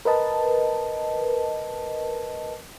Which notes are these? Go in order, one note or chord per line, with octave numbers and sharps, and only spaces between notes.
A#4 B4 D#5 A5